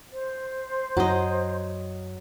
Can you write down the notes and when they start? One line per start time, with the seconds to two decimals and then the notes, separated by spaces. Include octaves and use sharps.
0.13 C5
0.97 F#2 F#3 D#5